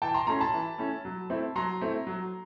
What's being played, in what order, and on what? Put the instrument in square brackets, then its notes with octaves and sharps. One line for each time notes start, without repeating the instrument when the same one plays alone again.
[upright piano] E3 G5 A5
A#5 C6
A3 C#4 E4 A#5 C6
A5 B5
E3
A3 C#4 E4
F#3
A3 C4 E4
F#3 A#5 C6
A3 C4 E4
F#3